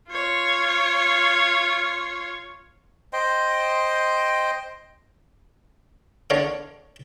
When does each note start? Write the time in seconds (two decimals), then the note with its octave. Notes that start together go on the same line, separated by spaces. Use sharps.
0.10 F4 C#5
3.13 C5 D#5 G5 C6
6.30 D3 C#5 F5